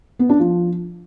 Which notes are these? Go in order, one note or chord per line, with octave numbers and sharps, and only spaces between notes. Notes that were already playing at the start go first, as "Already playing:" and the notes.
B3
D4
F3